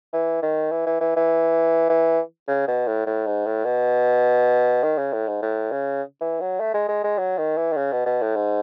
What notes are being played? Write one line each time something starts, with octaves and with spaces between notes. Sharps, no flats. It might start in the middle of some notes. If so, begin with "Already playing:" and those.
E3
D#3
E3
E3
E3
E3
E3
C#3
B2
A2
A2
G#2
A2
B2
D#3
C#3
A2
G#2
A2
C#3
E3
F#3
A3
G#3
G#3
G#3
F#3
D#3
E3
D#3
C#3
B2
B2
A2
G#2